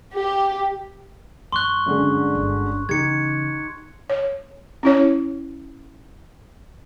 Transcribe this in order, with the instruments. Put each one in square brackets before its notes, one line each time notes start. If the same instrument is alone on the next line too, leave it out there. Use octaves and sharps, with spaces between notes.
[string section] G4
[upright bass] G2 [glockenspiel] C6 C#6 F#6
[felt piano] F#2 D3 G#3
[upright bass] G1
[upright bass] C#3 E3 [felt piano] D#4 G4 [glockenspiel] G#6 C#7
[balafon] C#5
C#4 E4 C#5